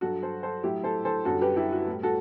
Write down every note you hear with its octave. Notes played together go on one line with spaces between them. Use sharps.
G2 F#3 F#4 A4
A4 C5
A4 C5
A2 F#3 E4 G4
A4 C5
A4 C5
F#2 D3 G3 F#4 A4
G4 B4
E4 G4
F#4
A2 G3
F#4 A4